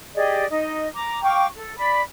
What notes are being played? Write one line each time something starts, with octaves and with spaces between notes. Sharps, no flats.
G4 G#4 D5 D#5
D#4 D#5
A#5 D6
F5 G5 C#6 D6
A4
D5 B5